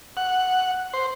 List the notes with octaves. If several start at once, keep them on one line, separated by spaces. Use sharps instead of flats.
F#5
C5